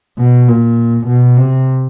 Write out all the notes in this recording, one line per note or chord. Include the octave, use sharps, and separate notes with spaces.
B2
A#2
B2
C3